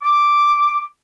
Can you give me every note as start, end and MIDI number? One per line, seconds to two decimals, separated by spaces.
0.02 0.83 86